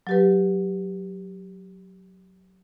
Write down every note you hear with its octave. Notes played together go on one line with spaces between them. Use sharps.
F#3 G4 B4